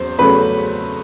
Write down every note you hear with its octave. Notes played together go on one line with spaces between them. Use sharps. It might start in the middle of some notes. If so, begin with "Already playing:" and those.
Already playing: E2 F#3 C5 C6
E2 C#3 F#3 A3 B4 B5